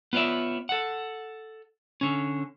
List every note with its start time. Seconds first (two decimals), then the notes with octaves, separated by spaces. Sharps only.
0.13 B3 F4 C#5 D5 E5
0.69 A4 F#5
2.01 D3 C#4